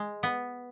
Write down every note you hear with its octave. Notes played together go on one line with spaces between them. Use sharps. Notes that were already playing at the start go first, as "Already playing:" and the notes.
Already playing: G#3
B3